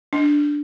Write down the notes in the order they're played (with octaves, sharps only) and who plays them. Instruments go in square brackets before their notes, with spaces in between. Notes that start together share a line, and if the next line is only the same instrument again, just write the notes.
[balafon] D4